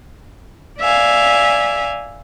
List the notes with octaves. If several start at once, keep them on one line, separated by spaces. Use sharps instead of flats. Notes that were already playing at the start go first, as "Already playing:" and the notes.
D5 E5 F5 G#5